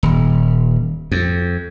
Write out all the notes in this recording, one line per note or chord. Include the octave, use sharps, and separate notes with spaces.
D#1
F2